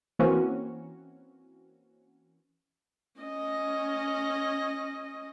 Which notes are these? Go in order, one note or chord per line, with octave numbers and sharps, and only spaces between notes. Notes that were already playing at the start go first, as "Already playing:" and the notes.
E3 A#3 C4 C#4 F#4
C#4 D#5